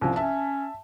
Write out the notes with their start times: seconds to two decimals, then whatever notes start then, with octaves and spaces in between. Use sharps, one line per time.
0.01 C2 F3 C#4
0.16 C#4 E5 A5